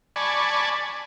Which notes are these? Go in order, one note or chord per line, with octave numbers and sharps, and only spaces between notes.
D5 G#5 A5 B5 C#6